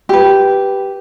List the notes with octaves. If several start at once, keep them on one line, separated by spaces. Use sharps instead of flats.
G4 B4